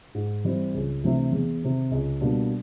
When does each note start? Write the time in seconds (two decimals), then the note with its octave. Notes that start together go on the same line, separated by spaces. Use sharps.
0.15 G#2
0.45 E3 G3 C4
0.74 C#2
1.03 C3 E3 A3 D4
1.32 E2
1.62 C3 D#3
1.91 C#2
2.21 B2 G3 A#3 D4